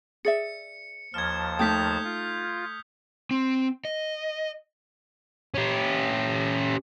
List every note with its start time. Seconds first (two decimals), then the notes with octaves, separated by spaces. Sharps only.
0.25 G#4 D5 E5 C#7
1.14 D#2 F3 A5 F6 G#6
1.59 A3 D#4 G5 D#6 G6 B6
2.04 F4
3.31 C4
3.85 D#5
5.55 C#4 G4